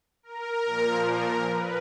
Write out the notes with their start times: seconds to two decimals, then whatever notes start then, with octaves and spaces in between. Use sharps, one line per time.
0.23 A#4
0.65 A#2 F3
1.06 A#4
1.48 B4